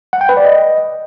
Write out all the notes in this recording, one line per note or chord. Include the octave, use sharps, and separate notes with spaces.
F#5
G5
B4
D5
D#5